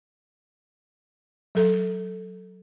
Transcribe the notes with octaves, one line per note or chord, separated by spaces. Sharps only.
F#3 A4